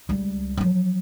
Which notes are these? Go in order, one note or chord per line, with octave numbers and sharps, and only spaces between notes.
C#2 G3
F3 F#3